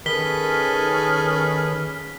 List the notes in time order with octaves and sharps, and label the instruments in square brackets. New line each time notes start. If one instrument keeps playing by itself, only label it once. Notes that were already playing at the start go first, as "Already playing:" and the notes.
[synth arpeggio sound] D#3 [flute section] C#4 F6 [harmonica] G#4 A4 B4 [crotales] B6 G7